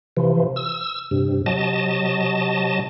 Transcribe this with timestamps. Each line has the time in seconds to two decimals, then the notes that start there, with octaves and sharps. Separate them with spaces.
0.17 C3 E3 F3
0.56 E6
1.11 G2 C3
1.46 C3 F#3 D#5 A5